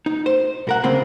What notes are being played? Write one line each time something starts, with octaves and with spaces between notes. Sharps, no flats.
D#4
C5
B1 A#4 F#5
C#3 G#3 A#3 C4